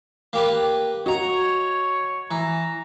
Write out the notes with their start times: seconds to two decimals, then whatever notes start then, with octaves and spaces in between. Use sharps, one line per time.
0.33 A#3 G4 B4
1.06 F#4 C#5 D#5 A#5
2.31 E3 A#5